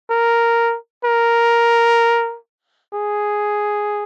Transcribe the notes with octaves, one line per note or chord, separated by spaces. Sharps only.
A#4
A#4
G#4